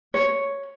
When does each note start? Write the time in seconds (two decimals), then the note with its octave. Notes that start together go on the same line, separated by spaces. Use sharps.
0.14 C#5